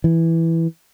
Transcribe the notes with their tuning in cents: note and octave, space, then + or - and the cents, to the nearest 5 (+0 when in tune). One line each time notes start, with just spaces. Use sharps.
E3 +0